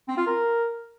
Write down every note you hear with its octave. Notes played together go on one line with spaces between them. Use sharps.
C4
F4
A#4